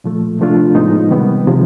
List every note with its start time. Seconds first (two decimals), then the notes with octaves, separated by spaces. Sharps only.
0.04 A#2 F3 A3
0.39 C3 F3 A3 D4 F4
0.75 A2 F3 G#3 B3 D#4
1.11 C3 D#3 G3 B3
1.47 C3 F3 G#3